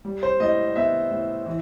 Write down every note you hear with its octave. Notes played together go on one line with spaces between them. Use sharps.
G3
C5
A2 D#5
B3 E5
A2
E3